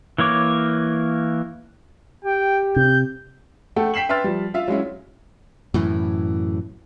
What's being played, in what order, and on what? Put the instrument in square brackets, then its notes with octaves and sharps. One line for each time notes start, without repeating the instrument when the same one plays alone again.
[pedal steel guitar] E3 A#3 C#5 D6
[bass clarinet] G4 [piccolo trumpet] G5
[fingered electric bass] C3 [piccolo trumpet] G6
[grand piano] A3 A4 F#5 G5
G5 B6 C7 E7 F#7
B4 E5 G5 C6 F6 A6
F3 G3
F4 E5 F5
F#3 G#3 C#4 E4
[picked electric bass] F#2 A2 E3